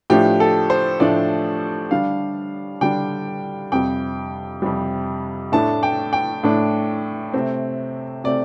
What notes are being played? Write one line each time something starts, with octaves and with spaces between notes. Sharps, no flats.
A2 F3 A3 D4 G4
A4
C5
A2 F3 A3 D4 D5
D3 G3 D4 F5
D3 G3 D4 G5
F2 C3 G3 G5
F2 C3 G3
A2 A3 D4 A5
G5
G5
A2 A3 D4
C3 A3 C4
C3 A3 C4 D5